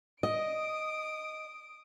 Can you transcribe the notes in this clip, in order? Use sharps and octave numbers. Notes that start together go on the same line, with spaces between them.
D#5 D#6 D7